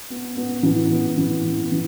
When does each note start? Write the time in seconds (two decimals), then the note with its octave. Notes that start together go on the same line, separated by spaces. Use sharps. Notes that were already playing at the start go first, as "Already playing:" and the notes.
0.10 B3
0.37 B3
0.63 E3
0.91 B3
1.17 E3
1.45 B3
1.72 E3